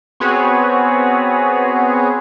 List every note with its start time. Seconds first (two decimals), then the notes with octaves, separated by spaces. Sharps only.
0.20 B3 C4 F#4 G#4 B4 C#5